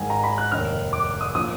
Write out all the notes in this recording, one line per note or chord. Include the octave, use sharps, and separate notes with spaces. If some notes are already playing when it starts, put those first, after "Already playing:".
Already playing: G#1 G#2 D#3 G#5
A#5
B5
F#6
F1 D#2 D#3 F6
D6
D#6
A#2 F3 D#6